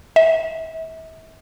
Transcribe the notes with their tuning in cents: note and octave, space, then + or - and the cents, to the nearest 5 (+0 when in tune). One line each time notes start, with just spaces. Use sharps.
E5 -35